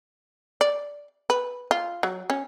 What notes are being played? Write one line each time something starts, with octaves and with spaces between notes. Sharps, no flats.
D5
B4
F4
F#3
C#4